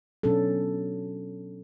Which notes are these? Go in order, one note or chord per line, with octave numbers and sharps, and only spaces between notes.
B2 F#3 C#4 D4 A4